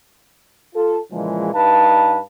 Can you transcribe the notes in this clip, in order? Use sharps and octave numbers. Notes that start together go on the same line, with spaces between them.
F4 A4
A#2 C#3 E3 F3 G#3
G2 D#4 B4 F5 A5